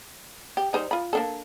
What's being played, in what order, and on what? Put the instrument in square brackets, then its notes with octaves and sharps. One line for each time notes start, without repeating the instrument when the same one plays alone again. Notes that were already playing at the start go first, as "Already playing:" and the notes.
[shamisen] G4
G3 D#4 C5
F4 B5
A#3 D4 A4